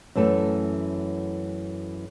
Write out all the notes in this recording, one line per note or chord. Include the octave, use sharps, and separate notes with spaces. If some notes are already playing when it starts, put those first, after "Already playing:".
F#2 E3 A3 A4